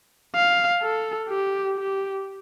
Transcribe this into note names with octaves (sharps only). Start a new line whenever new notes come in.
F5
A4
G4
G4